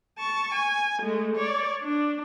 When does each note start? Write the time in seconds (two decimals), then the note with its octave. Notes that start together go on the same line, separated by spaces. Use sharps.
0.18 A5 C#6
0.54 G#5
1.02 G#3 A3
1.36 C#5 D5
1.83 D4